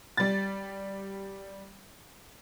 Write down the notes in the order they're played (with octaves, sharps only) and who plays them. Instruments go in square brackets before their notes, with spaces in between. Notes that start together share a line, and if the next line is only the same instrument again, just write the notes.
[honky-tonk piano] G3 A6